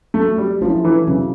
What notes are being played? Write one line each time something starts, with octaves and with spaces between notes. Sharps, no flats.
F#3 A3
G3
F3 A3 C#4 E4
E3
C#3 F#3